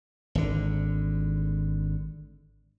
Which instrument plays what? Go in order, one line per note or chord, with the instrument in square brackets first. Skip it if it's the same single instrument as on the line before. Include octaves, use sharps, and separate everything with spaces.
[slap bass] G#1 D3